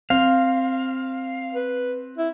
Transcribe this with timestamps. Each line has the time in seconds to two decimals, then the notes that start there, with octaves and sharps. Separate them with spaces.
0.10 C4 F5
1.55 B4
2.18 E4